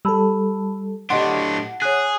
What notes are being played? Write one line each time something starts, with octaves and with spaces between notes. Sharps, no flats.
G3 A4 A5 B5 E6
A2 D4 G4 D#5 F#5 C6
G#4 C#5 D#6 F#6